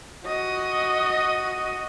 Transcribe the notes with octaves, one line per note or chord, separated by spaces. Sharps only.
F#4 D#5